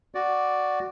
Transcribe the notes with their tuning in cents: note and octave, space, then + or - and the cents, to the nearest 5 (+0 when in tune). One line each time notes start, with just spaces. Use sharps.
F#4 +0 D5 +0